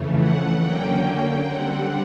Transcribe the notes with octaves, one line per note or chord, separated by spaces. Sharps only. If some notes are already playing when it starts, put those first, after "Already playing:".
Already playing: F2 C#3 E3 A3
F#5
D3 F#3 A#3 C#4 G5
G5
D3 G3 C4 F#5